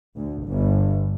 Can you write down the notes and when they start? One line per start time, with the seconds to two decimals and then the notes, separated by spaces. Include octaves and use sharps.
0.16 D2
0.45 G1